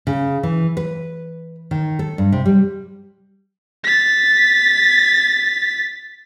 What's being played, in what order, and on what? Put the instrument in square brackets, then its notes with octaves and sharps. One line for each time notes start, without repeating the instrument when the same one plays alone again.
[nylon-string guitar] C#3
E3
B4
D#3
A4
G2
C3
G3
[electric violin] A6 B6